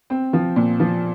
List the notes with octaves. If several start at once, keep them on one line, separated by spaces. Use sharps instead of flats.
C4
F3
A#2
F3